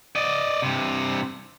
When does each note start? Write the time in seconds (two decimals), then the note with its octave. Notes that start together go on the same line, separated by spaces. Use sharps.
0.15 D5 D#5
0.62 G2 C3